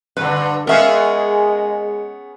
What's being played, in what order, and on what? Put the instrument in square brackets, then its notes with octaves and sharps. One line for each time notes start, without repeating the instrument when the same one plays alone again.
[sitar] G2 D3 [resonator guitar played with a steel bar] B4
[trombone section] G#3 [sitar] B3 C#4 G#4 [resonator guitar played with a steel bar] A#4 E5 F5